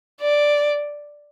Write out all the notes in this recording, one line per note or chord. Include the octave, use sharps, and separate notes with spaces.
D5